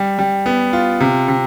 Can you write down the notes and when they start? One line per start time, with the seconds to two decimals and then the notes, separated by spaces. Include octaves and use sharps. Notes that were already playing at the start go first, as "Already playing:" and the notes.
Already playing: G3
0.19 G3
0.46 B3
0.73 F4
1.01 C3
1.28 C3